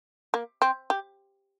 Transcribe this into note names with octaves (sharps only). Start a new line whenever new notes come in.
A#3
C4
G4